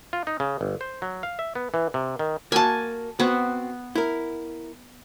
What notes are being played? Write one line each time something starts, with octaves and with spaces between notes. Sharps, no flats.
F4
D#4
C#3
G1
C5
F#3
F5
E5
B3
E3
C3
D#3
A#3 F#4 G#5 A5
B3 C4 F#4
E4 A#4